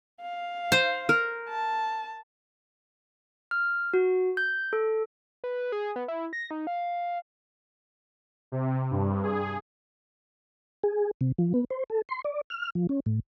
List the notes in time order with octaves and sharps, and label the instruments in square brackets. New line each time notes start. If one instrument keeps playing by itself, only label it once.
[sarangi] F5
[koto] C5
[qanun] A#4
[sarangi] A5
[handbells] F6
F#4
G6
A4
[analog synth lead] B4
G#4
B3
E4
A#6
D#4
F5
[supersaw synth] C3
G2
G#4
[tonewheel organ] G#4
C3
F3
B3
C5
A4
C6
D5
F6
F3
C#4
A2